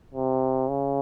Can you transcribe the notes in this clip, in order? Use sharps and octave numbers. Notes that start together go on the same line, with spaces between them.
C3
C#3